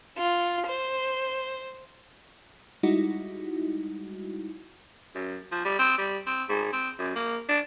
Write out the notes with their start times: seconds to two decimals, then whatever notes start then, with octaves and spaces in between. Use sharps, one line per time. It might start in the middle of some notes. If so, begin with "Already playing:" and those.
0.18 F4
0.67 C5
2.83 G3 G#3 D#4 E4 F#4
5.15 F#2
5.52 F3
5.65 G3
5.79 C4
5.98 G3
6.27 C4
6.49 G#2
6.73 C4
6.98 F#2
7.16 A#3
7.49 D4